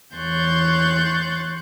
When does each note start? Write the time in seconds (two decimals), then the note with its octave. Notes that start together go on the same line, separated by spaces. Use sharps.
0.16 E2 C#5 C6 F#6 G6 A6